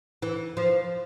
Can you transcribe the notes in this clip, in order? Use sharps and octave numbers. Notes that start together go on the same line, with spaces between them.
E3
F3